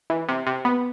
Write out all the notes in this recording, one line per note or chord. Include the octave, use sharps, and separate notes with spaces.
E3
C3
C3
B3